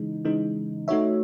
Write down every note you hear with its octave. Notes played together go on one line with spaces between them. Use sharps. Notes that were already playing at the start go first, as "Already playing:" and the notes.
Already playing: C#3 E3 G#3 D#4
C#3 E3 G#3 D#4
A3 D#4 F#4 C#5 E5